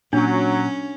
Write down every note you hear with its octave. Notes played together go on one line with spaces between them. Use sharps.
A#2 F#3 C#4 D4